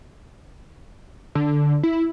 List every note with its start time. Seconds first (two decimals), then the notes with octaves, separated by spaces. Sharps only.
1.35 D3
1.83 E4